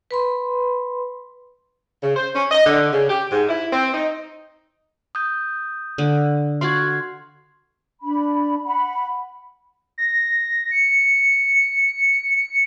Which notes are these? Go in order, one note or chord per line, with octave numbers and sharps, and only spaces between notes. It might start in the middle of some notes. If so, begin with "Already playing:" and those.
B4 B5 C6
C#3
C5
C#4
D#5
D3
C#3
G4
G#2
E4
C4
D#4
D#6 G6
D3
F#4 D5 F5 C6 G#6
D4 B5
F#5 B5
A#6
C#7